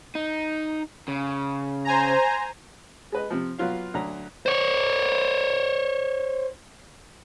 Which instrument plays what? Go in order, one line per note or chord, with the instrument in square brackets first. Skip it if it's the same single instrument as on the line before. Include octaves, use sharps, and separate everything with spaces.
[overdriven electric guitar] D#4
C#3
[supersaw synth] C5 G#5 A#5
[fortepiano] G#3 B4 D#5
C3 F3
F#3 B3 F4 F5
D2 F#3 A#5
[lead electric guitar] C5 C#5